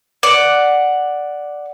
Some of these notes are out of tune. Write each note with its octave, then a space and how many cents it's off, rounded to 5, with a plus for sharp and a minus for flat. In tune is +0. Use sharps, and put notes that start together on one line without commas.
D5 +0 F#5 +0